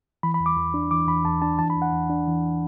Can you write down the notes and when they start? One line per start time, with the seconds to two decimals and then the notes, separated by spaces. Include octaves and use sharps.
0.23 E3 B5
0.34 B5
0.40 E2
0.46 D6
0.57 E2
0.74 D4
0.91 E3 D6
1.08 E2 B5
1.25 E2 A5
1.42 D4 A5
1.58 E3 A5
1.70 B5
1.76 E2
1.82 F#5
1.93 E2
2.10 D4
2.27 E3